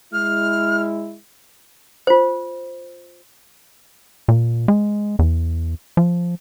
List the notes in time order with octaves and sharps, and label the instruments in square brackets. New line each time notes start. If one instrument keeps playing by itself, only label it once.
[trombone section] G#3 E4 [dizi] F6
[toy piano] F4 C5
[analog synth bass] A#2
G#3
E2
F3